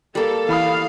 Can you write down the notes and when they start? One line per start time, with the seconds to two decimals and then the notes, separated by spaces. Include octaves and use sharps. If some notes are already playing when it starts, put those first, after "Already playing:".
0.15 G3 A#3 A4
0.49 E3 F5 B5 D#6